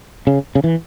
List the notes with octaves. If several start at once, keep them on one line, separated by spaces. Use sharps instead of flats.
C#3
C#3
E3